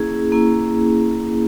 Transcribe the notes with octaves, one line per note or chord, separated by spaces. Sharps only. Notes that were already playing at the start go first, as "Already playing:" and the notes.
Already playing: A#3 C#4 E4 G#4
A#3 C#4 E4